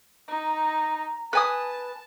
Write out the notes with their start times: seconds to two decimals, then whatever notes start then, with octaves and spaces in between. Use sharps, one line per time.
0.28 D#4 A#5
1.33 B4 G#5 A5 D#6